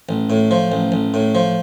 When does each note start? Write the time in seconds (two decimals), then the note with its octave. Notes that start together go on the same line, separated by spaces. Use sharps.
0.09 A1
0.30 A2
0.51 F3
0.72 A1
0.92 A1
1.14 A2
1.35 F3